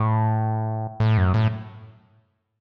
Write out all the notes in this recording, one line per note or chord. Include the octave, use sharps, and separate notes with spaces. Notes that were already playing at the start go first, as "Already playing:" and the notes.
Already playing: A2
A2
F#2
A2